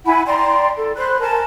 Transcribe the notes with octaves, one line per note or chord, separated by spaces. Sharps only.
E4 F#5 G#5 B5
D5 G5 A#5 C6
A4
C5 B5 C6 F#6
A#4 G#5 A5